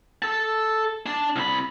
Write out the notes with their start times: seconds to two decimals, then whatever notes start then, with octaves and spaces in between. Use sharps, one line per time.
0.22 A4 A5
1.06 D4 A5
1.36 C2 B5